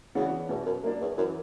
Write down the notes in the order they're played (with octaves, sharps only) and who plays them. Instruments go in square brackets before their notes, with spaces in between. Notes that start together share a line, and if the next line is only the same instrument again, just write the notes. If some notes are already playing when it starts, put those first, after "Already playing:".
[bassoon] C#3 [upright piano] E3 B3 D4 F#4
[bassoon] E2 [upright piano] B2
[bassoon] F#2
[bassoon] F#2 [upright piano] A#3 D4
[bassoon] E2
[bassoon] F#2 [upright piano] E3